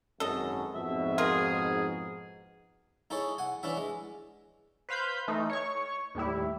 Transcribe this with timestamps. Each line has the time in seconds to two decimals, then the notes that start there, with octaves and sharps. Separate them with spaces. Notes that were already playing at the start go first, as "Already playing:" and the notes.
0.20 G#1 F#2 A4 D#5
0.75 F2 G#2 B2 E5
1.18 F4 G#4 A#4
3.10 D#4 E4 G#4 A4 C#5
3.38 F#5 G#5
3.63 E3 C#4 D4 E4 E5
3.77 G#3
4.89 B4 C5 F5 B5 G6
5.28 E3 A3 D#4
5.50 C#5 C#6
6.15 D#2 A2 G3 E4